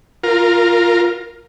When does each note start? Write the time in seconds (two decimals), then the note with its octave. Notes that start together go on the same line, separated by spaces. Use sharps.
0.24 F4 A#4